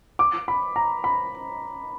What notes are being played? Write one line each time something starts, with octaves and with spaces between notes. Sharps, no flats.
D6
B5
A#5
B5